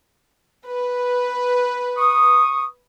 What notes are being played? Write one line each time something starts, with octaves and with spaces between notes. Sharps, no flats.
B4
C#6 D#6